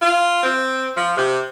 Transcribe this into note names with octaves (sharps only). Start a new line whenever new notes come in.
F4
C4
F3
C3